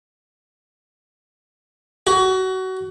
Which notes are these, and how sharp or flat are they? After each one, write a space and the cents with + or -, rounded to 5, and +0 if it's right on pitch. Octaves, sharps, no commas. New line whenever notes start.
F#4 +25